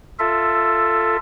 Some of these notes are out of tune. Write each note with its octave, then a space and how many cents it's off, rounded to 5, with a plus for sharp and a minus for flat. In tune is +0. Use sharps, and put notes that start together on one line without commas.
F4 -5 A4 +10 E5 +0